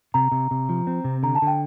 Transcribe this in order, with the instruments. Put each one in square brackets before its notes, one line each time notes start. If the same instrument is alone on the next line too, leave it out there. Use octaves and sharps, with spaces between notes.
[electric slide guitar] C3 [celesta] A#5
[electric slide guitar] C3
C3
F3
C4
C3
[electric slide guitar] D3 [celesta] A#5
[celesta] A5
[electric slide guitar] D3
[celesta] G5